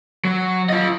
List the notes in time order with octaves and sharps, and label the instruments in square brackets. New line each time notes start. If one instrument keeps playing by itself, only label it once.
[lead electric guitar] F#3
F4 D#5